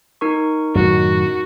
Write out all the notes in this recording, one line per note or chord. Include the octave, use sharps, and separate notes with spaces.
D#4 A#4 C#6
F#2 A2 D#3 F#4